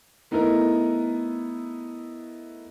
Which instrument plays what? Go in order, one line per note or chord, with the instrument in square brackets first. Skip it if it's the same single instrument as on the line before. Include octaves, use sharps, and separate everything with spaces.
[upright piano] A3 B3 D#4 E4 A#4